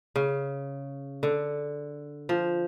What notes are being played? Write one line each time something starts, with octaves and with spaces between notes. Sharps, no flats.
C#3
D3
F3